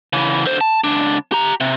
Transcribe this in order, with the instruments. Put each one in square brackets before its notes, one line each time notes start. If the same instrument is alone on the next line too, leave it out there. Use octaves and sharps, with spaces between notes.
[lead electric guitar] C#3 E3
D3 C5
A5
C#2 D4
G4 A#5
C3